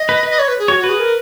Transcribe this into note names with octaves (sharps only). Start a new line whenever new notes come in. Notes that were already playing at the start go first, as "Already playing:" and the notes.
Already playing: D#5
B4
B4
D#5
C#5
B4
G#4
F#4 C#5
F#4
B4
G#4
A#4